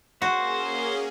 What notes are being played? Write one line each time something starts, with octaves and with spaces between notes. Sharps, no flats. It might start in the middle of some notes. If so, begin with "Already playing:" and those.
A#3 C#4 F#4 G#4 C5